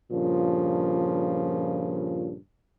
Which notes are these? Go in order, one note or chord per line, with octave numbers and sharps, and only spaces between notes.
G2 A#2 C#3 F3